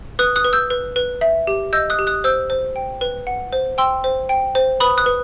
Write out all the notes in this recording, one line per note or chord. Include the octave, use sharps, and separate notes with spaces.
B4 D#6 F#6
D#6 F#6
B4
E6 G6
B4
B4
E5
G4
D#5 E6 G6
D#6 F#6
G4
D#6 F#6
C5 E6 G6
C5
G5
B4
F#5
C5
G5 C6 E6
C5
G5
C5
B4 B5 D#6
D#6 F#6
B4